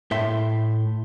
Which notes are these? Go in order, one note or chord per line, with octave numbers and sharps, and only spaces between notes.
A2 E5 C6